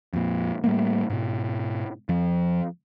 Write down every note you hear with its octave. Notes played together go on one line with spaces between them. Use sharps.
F2 A#2
A2 G3 A3 A#3
G#2 B2
F2 F3